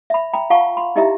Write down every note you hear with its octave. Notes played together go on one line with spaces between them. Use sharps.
E5 B5
G5 A#5 B5
F4 F5 F#5 A5 C#6
B5 C6
D#4 E4 G4 D#5 E5 A#5